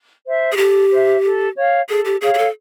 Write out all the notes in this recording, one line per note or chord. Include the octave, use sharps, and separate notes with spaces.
C5 E5
G#4
G4 A4
C5 E5
A4
C#5 F5
G#4 A4
G4
G#4 C#5 F5
G#4
A4